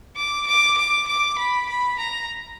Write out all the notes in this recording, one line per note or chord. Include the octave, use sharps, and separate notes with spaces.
D6
D6
D6
D6
B5
B5
A#5